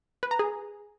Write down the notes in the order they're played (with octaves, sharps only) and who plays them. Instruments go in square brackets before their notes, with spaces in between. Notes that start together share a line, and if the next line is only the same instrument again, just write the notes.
[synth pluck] B4
A#5
G#4